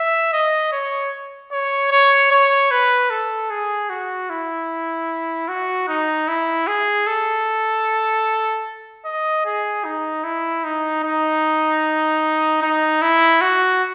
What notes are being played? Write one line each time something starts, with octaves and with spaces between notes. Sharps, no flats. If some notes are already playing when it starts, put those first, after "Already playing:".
Already playing: E5
D#5
C#5
C#5
C#5
C#5
B4
A4
G#4
F#4
E4
F#4
D#4
E4
G#4
A4
D#5
G#4
D#4
E4
D#4
D#4
D#4
E4
F#4